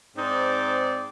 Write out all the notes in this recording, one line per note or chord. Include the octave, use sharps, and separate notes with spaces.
G#2 C4 D#4 C5 D5